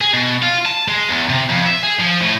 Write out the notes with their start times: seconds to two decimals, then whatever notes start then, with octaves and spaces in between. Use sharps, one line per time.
0.01 G#4
0.13 B2
0.42 F4
0.65 A5
0.88 G#3
1.09 E2
1.29 C3
1.49 F2
1.66 E5
1.83 G#4
2.00 F3
2.22 A2